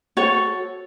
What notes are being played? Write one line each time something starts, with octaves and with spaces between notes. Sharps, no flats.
F#4 A4 C#5